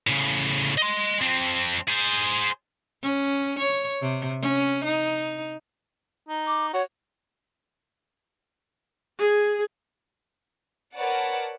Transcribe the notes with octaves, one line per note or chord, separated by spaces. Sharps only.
A2 C#3
D#5 C6
F2 C4
G#4 C5
C#4
C#5
C3
C#4
D#4
D#4
D6
F#4 C#5
G#4
A#4 B4 C#5 D5 F#5 A5